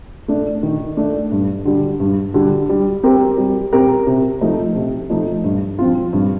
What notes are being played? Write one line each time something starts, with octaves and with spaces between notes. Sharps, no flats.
A3 D4
D#3
A3 D4
G2
D3 G3
G2
D3 G3
G3
C4 G4 A#4
G3
C4 G4 A#4
C3
F3 A3 D#4
C3
F3 A3 D#4
G2
F3 C4 F4
G2